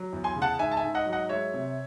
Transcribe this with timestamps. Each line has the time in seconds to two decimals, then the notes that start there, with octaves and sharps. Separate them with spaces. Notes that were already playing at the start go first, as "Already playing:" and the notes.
Already playing: F#3
0.13 E2
0.24 G#5 C6
0.36 C#3
0.42 F#5 A5
0.59 G#2 E5 G#5
0.71 A5
0.77 E5 G#5
0.83 G#2
0.94 D#5 F#5
1.06 F#3
1.12 D#5 F#5
1.29 G#3 C#5 E5
1.54 C3